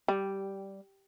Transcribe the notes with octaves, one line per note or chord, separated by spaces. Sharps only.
G3